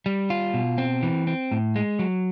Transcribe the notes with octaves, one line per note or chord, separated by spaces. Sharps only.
G3
F4
B2
C4
E3
C4
A2
G#3
F#3